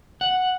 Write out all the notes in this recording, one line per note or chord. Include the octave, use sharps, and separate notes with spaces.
F#5